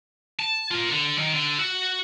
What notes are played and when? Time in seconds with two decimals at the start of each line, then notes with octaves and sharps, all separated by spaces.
0.39 A5
0.71 F4 A#4
0.90 D3
1.18 D#3 D#4
1.33 D3
1.59 F#4